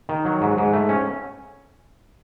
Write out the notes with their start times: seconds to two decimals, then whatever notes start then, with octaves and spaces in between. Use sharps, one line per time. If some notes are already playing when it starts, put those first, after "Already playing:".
0.09 D#3
0.25 F#3
0.41 G#2
0.57 G#2
0.73 A3
0.89 C#4